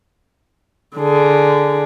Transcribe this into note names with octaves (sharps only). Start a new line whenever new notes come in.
D3 G#4